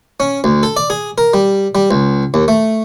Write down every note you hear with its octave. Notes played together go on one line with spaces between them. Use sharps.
C#4
D2
A4
D5
G#4
A#4
G3
G3
C#2
D#2
A3